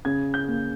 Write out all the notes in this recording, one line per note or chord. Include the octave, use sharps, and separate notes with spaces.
C#3 G#6
G6
A#3